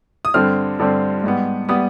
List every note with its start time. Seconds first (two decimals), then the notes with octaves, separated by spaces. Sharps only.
0.25 D#6
0.34 G2 D3 G3 C4 F6
0.79 G2 D3 G3 C4
1.24 G#2 G3 B3
1.69 G3 B3 D#6